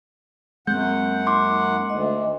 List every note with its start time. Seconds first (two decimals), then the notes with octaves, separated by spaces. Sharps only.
0.67 F#2 G#3 A#3 C4 F#5 G6
1.27 D#4 C6 D6
1.90 D2 D#5